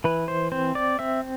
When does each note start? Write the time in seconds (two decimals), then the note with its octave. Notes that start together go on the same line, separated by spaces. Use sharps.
0.04 E3 B4
0.28 C5
0.52 C4 C5
0.75 D5
0.99 C4 E5